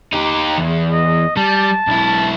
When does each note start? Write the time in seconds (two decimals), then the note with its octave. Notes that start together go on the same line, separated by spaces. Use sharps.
0.13 D#4 G4
0.57 E2
0.92 D#5
1.37 G3 A5
1.87 B1 E4